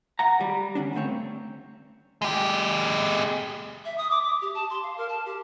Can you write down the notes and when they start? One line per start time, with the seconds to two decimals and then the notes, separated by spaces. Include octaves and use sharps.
0.19 F#5 A#5
0.41 G3
0.75 D3 C#4 D4
0.93 C#2 G2 A3 C4 C#5
2.22 G#3 G4
3.85 E5
3.98 D#6
4.10 D6
4.22 D6
4.42 G4
4.55 A5
4.70 C6
4.83 F5
4.98 A#4
5.09 A5
5.26 G4